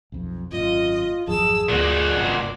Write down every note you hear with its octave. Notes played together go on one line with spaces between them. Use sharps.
B1 F2
G#1 F#2 A#2 F4 D#5
G#1 F2 F#3 G#4 A5 E6
D2 A#2 F#4 D5
F#1 C2 G2